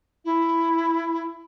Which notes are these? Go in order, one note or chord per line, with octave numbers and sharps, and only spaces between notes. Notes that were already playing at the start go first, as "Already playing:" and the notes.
E4